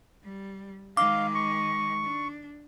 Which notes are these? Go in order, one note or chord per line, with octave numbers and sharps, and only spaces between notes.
G3
D#3 G#3 F5 D6
C#6
D4